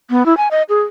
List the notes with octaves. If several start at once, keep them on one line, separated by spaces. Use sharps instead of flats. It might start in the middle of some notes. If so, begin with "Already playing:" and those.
B3
E4
G#5
D#5
G#4